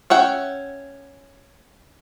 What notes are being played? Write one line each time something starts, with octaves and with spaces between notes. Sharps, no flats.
C#4 E5 F#5 G5